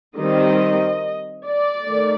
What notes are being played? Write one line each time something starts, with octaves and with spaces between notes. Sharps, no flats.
D#3 G3 C4 D#5
D5
D#3 A3